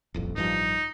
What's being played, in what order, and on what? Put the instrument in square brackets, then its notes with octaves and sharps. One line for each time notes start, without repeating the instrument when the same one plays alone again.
[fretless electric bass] D#1 A1 F2
[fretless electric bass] A1 G2 F3 [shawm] D#4